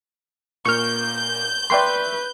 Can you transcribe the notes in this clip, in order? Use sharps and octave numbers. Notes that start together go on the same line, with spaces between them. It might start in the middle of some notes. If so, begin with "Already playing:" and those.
A#2 A#3 C#6 F6 G6
B4 D5 E5 G5 C6 C#6